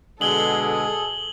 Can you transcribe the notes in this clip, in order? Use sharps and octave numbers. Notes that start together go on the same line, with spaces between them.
B2 D3 G#3 G#4 A4 F#7 G7